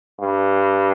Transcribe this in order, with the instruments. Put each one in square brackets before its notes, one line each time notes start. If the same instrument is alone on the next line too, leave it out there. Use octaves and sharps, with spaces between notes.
[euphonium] G2